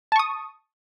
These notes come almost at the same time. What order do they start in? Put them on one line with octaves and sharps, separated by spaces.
A5 C#6 D#6